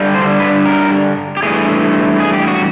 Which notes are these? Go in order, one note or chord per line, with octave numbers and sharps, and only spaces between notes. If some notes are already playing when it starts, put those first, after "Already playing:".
Already playing: G2 D3 G3
C5
B4
A#4
G4
G2 E3 A3 G#4
G#4
G4
F#4